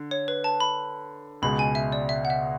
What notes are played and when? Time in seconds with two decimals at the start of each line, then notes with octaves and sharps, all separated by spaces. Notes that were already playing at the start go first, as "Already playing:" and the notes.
Already playing: D3
0.11 C#5
0.28 B4
0.44 A5
0.60 B5
1.42 C#2 B2 G#3 B5
1.59 G#5
1.75 E5
1.92 D5
2.09 E5
2.25 F#5
2.30 E5